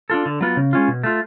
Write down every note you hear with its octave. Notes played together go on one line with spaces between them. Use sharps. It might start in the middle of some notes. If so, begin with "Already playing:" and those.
D4 F4 A4
D3
F#3 B3 F4
C#3
G#3 C#4 F4
B2
A3 F4